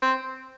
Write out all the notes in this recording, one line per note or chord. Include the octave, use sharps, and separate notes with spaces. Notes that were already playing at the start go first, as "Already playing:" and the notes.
C4